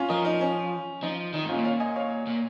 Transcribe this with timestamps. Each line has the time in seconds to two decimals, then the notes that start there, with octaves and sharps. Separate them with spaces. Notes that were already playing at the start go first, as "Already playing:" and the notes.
Already playing: C#4 F4
0.09 F3 A#4 D#5
0.25 D#4
0.41 C#4
1.03 F3 D#4
1.33 D#3 D#4
1.44 G#2 C#4 F4
1.54 A#2
1.65 C#5 F5
1.80 D#5 G#5
1.96 C#5 F5
2.26 A#2